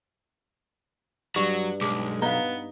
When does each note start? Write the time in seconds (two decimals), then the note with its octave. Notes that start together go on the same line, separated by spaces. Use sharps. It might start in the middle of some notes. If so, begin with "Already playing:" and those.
1.36 G2 F#3 C#6
1.81 B1 G#3 D6
2.22 B3 D#4 F5 A#5